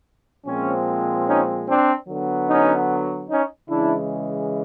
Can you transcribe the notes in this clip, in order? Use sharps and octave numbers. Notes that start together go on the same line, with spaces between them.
A#2 F3 G#3 C4 C#4
C#4 D#4
C4 D4
D3 F#3 B3
C#4 D#4
C#4 D#4
C#3 E3 G#3 D4 E4